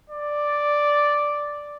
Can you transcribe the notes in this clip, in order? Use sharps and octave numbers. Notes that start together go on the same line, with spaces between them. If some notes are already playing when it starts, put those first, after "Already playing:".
D5